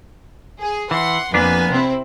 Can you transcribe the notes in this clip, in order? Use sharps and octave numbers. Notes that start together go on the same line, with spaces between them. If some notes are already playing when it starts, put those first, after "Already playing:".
G#4
E3 F#5 C6
F2 A#3 B3 D4 B4 G#5
C3 C4 E4